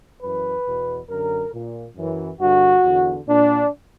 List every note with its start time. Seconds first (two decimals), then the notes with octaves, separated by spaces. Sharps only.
0.22 F#2 E3 B4
0.66 E2 B2
1.09 F#2 D3 A#4
1.53 A#2
1.96 F#2 E3
2.40 G2 D3 F#4
2.83 E2 D3
3.27 A#2 D4